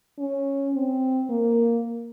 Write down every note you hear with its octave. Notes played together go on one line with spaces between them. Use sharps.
C#4
C4
A#3